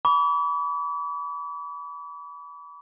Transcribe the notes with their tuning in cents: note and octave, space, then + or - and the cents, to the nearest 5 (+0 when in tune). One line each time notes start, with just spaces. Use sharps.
B5 -10 D6 -45